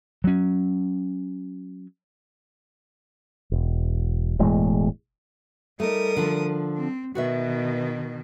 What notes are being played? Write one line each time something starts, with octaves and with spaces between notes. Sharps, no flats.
F#3 C#4
E1
E1 E2 A2 G#3
G3 A3 D#4 A#4 D#6
D3 F3
C4
B2 D#3 F#4 B4 E5